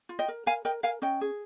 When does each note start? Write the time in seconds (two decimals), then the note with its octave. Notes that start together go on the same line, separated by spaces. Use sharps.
0.09 F4
0.19 D#5 G5
0.28 A#4
0.46 A#4 F5 G#5
0.65 A#4 D#5 G5
0.83 A#4 F5 G#5
1.02 C#4 D#5 G5
1.21 G#4